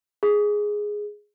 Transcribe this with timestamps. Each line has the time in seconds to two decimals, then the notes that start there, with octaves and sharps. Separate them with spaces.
0.23 G#4